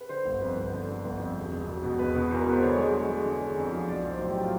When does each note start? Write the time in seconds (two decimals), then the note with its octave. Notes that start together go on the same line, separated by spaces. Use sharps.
0.01 B4
0.09 D3 C5
0.25 G1
0.41 F2 B4
0.57 G1
0.73 D3
0.88 D3
1.05 G1
1.19 F2
1.36 E1
1.52 E1
1.67 E1
1.83 B2
1.99 E1 B4
2.15 B2
2.31 E2 A#4
2.44 B2 B4
2.52 C5
2.62 D3 C#5
2.78 G#3
2.93 G#3
3.10 G#3
3.25 D3
3.41 D3
3.57 F2
3.73 F3
3.88 B1 D5
4.04 B1
4.09 C5
4.20 A2
4.30 G4
4.36 F#3
4.43 F4